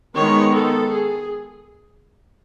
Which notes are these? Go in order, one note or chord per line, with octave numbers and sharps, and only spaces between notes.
D#3 G#3 B3 C#5
A4
G#4